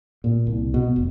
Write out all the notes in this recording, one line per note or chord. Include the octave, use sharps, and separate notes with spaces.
A#2
C2
B2
F1